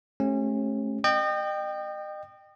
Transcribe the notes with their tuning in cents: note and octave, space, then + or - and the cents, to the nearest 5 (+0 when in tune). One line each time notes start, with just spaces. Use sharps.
A3 -25 C#4 -30 G4 +0
D#5 -35 G5 +0